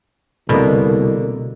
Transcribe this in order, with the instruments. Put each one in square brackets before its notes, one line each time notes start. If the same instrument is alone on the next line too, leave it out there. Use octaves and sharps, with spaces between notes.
[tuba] C2 [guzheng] B2 [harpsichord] D3 A#3